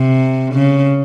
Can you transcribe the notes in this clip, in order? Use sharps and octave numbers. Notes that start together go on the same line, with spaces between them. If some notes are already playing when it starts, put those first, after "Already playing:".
Already playing: C3
C#3